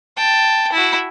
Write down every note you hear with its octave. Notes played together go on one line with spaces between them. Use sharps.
G5 A5
E4 F#4